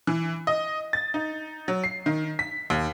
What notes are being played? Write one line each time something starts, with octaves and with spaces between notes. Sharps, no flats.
E3
D#5
A6
D#4
F#3
C7
D#3
B6
D#2